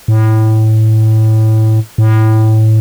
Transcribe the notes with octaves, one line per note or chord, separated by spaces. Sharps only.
A2
A2